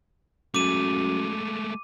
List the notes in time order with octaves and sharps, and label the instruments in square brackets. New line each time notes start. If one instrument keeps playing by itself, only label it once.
[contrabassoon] F#2 [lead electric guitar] G#3 A3 [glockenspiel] D6 D#7